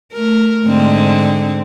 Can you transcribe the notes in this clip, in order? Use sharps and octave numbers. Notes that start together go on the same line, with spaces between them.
A3 A#4
G#2 D3 C4